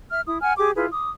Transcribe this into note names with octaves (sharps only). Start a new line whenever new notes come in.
E5 F6
E4 D#6
F#5 G#5 F6
G4 G#4 D6
E4 F4 G#4 B4
D6 D#6